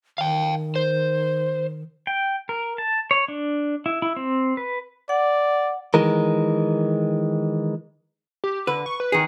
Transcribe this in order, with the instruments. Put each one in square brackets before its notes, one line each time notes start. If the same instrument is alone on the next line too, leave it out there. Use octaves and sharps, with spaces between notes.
[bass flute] D#3 [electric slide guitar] F5 G5
[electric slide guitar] C5
[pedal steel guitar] G5
A#4
A5
C#5
D4
E4
E4
C4
B4
[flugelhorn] D5 [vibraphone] F#5
[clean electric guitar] D#3 E3 G#3 A#4
[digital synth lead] G4
[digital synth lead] D3 [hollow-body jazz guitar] B4
[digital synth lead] C#6
B4
[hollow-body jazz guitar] D#3 G#4